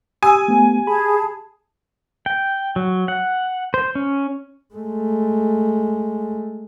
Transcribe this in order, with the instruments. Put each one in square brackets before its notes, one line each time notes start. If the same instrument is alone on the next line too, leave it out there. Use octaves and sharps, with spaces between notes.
[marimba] G4 [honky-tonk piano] G#5 [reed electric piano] D#6 E6
[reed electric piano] A3 B3
[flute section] G#4 A5 [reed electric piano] B5
[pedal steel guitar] G5
F#3
F#5
C5
C#4
[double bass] G#3 A3